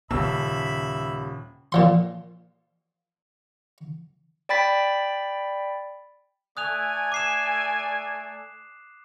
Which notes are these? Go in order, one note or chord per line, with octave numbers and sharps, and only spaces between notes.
D#1 C#3 E5 B5 E6
A#2 F3 C6
D5 G5 B5 A6 B6
A3 D5 G#5 D#6 F#6 F7
D6 C7 E7